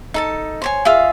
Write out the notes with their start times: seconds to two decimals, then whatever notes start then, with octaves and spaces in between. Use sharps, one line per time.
0.14 D#4 A4 A5
0.62 C5 C#5 G#5
0.85 F4 G#4 E5 F5